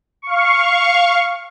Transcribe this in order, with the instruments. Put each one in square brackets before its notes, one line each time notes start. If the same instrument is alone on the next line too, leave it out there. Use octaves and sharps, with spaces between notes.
[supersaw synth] F5 C#6